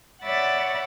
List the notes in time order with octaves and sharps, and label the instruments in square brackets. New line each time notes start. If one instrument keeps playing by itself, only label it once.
[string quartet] C#5 D5 E5 F#5 B5 A6